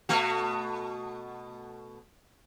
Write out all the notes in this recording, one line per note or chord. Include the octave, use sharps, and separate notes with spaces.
B2 A3 F#4